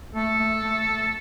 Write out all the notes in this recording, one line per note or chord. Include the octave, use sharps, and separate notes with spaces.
A3 A4
A3
A3
A3